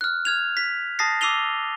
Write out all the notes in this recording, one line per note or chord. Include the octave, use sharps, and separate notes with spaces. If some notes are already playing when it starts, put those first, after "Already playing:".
F6 F#6
F6 G#6 F7
B6
A5 D#6 A6 A#6 C7
D6 E6 C7 D#7 F7 G7